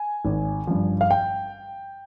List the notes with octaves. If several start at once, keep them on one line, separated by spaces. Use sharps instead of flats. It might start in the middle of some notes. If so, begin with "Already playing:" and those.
Already playing: G#5
G#1
G2 F3
F5
G5